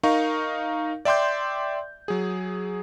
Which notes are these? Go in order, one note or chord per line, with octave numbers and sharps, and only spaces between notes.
D#4 A#4 F5 C#6
D5 E5 G5 C6 D6 G6
F#3 G#4